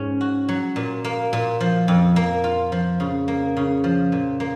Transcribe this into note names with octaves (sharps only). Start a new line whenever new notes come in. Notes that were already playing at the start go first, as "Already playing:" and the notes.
Already playing: G#2 C#4
F#4
F#3
A#2
A#3
A#2
F3
F2
A#3
F4
F3
C#3
A#3
C#3
F3
A#2
A#3